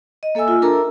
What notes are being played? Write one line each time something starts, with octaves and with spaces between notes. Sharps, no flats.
D#5
A#3 A4 E5 G#5 E6
F4
D4 A4 A#4 E5 A5 A#5